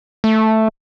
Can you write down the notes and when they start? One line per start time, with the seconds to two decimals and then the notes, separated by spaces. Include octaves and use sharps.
0.24 A3